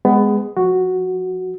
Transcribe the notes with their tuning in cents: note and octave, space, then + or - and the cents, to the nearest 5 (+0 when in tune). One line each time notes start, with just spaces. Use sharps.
G#3 -5 B3 +20
F3 +25 F#4 +0